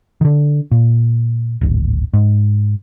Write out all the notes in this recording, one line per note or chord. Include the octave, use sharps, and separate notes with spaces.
D3 D#3
A#2
D1 G#1
G#2